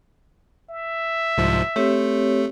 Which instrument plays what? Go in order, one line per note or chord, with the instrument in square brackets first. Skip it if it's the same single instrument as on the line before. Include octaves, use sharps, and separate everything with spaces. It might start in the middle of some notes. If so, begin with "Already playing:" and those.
[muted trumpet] E5
[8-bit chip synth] C2 G#2 F3
[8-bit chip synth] A3 [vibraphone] C4 G4 C#5